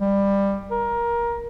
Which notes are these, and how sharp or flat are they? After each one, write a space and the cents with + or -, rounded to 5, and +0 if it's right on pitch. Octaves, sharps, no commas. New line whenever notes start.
G3 +15
A#4 +20